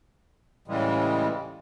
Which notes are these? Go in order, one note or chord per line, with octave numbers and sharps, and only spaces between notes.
A2 C#3 E3 G3 G#3